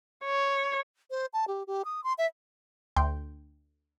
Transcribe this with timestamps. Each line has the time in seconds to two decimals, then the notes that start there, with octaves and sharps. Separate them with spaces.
0.24 C#5
1.11 C5
1.33 A5
1.48 G4
1.67 G4
1.85 D#6
2.04 C6
2.18 E5
2.96 D2 G5 C6